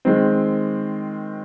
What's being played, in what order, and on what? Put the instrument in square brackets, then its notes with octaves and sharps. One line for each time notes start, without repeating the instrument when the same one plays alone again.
[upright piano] D#3 G#3 C4